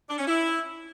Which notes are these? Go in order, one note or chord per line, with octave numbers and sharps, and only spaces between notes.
D4
C#4
E4